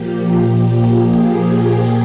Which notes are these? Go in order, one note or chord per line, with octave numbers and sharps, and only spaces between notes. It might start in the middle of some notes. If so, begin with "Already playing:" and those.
Already playing: A#2 F3 A#3 G4
G4
G#4